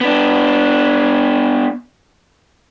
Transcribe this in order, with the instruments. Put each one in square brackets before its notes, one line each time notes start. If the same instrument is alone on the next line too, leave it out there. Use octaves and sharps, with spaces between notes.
[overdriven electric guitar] B3 D4